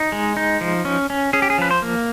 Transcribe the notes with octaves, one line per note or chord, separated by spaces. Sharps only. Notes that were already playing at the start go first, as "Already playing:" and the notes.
Already playing: D#4
G#3
D#4
F3
C#4
C#4
C#4 G#4
G4
G#4
F3 B4
C5
A#3